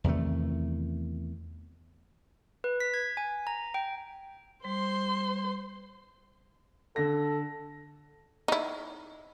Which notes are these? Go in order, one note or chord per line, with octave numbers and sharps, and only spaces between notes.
E2 C3 D#3 A3
B4
B6
G#6
G#5
A#5
G5
G3 C5 C6
D3 A4 A#6
D#4 E4